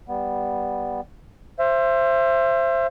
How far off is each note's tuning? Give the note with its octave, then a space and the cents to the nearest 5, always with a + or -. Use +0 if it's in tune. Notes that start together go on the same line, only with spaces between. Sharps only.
G3 +0 B3 -5
C5 +15 E5 +35